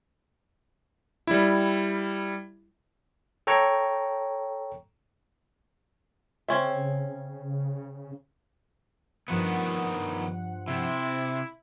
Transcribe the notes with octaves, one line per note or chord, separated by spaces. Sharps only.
G3 E4
A4 C#5 G5 A#5 C#6
C#3 C4 C#4 E5
G2 D#3 F3 B3 F#5
C3 E4